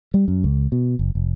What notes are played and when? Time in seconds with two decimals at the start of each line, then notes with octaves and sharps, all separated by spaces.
0.14 G3
0.28 F#2
0.44 C#2
0.72 B2
0.99 F#1
1.15 F1